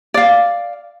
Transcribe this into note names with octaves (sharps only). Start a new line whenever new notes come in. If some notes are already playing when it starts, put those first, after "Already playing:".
D5 F5